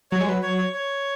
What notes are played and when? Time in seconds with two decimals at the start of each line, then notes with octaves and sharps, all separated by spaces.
0.12 F#3 C#5
0.21 G#3
0.27 F#3 B4
0.43 C#5
0.58 C#5
0.74 C#5